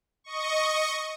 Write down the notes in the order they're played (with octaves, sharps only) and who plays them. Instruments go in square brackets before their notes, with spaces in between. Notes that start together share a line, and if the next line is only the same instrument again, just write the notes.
[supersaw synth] D#5 C#6